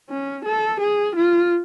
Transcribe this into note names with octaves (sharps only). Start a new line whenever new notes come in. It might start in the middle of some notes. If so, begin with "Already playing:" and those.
C#4
A4
G#4
F4